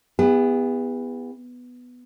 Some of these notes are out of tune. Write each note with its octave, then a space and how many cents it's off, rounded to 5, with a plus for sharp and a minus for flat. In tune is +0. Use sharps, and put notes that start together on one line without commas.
B3 +0 E4 +0 G#4 -45